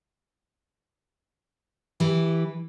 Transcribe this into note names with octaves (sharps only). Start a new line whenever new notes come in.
E3 E4 G4